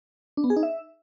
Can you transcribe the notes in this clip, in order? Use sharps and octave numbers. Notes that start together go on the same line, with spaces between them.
D4
B3
G#4
D#4
E5